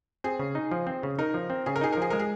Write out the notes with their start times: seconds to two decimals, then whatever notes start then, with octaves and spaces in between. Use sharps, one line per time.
0.24 C4 G#4
0.39 C#3
0.55 D#4
0.71 F3
0.87 C4
1.03 C#3
1.19 D#4 A#4
1.34 F3
1.50 C4
1.66 C#3 G#4
1.76 A#4
1.81 D#4 G#4
1.93 A#4
1.97 F3 G#4
2.10 G#3 A#4
2.19 G#4